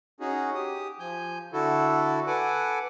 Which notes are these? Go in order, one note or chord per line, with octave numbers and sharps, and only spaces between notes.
C#4 D#4 F#4 G#4
G4 D#6
F3 G#5 G6
D3 E4 F#4 A4
A4 B4 F#5 G#5 D6